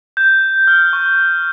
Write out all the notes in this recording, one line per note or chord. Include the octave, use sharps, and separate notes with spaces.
G6
F6
C#6